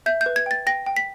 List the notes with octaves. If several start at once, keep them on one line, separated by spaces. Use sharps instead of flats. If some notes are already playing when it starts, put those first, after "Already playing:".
E5 G6
G6
B4
G#6
G5 A6
G5 A#6
G5
B6